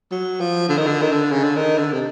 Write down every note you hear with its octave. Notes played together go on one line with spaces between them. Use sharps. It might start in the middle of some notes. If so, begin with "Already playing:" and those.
F#3
F3
D3
D#3
D3
D#3
D3
C#3
D3
D#3
D3
C3